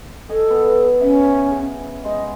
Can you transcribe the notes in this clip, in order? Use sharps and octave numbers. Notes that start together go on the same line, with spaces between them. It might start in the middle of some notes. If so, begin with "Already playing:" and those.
A4 D#5 G#5
B3
C#4 E5
C#3
G#3 D#5